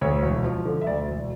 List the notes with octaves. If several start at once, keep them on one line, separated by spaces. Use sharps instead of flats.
D2 C#5
E1
F3
D3
E5
D2 D5
E1